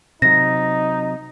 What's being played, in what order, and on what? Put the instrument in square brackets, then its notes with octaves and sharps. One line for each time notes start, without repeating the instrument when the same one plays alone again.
[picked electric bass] C3 F#3 [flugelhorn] D#4 [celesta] A#6